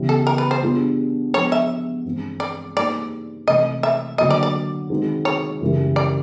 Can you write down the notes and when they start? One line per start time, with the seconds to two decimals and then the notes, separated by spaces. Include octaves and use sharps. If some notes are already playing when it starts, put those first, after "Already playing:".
Already playing: C#3 E3 G3 B3
0.09 A4
0.27 A#4
0.38 B4
0.51 C5
0.62 G3 B3 D4 F4 G#4
1.33 F3 G#3 B3 C#5
1.52 E5
2.04 G2 E3 G#3 C4
2.40 D5
2.76 G3 A#3 D#4 G#4 C5 D5
3.47 C3 E3 A3 D#5
3.83 E5
4.18 D3 F#3 A#3 D#5
4.30 D5
4.43 D5
4.90 D#3 G#3 C4 D#4 F#4
5.25 C#5
5.61 F#2 C#3 E3 G3
5.96 D5